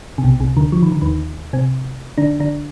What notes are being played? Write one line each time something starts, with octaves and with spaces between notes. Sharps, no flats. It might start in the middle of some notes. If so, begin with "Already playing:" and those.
C3
B1 B2
C2 C3
D2 D3
F3
D#3
D3
D#2 D#3
C3 C4
D3 D4
D3 D4